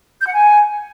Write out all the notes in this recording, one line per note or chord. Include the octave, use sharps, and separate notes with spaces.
G6
F#5
G#5